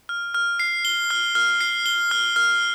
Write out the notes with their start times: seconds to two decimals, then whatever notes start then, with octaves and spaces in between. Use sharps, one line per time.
0.09 F6
0.34 F6
0.60 C7
0.85 G7
1.10 F6
1.35 F6
1.61 C7
1.86 G7
2.11 F6
2.36 F6